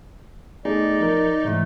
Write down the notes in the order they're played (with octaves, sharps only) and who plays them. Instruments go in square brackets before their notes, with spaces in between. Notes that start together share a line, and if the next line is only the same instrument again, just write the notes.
[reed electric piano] A3 B3 G#4 [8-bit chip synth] D#4 [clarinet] D5
[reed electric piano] F3 A#4
[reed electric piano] G#2 E3 [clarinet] A3